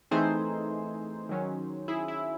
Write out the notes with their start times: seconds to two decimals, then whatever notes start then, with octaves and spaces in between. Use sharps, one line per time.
0.11 E3 A3 C4 D#4 G#4 C5
1.29 D#3 F#3 C#4
1.88 E4 G#4
2.08 E4